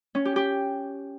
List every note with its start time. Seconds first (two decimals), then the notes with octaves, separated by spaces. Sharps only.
0.15 C#4
0.25 G4
0.36 G4